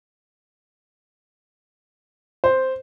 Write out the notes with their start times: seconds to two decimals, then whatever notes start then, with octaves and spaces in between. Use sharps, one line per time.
2.44 C5